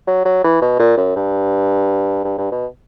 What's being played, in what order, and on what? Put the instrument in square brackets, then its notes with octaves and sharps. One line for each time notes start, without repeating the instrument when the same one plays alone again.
[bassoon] F#3
F#3
E3
B2
A#2
F#2
G2
G2
G2
B2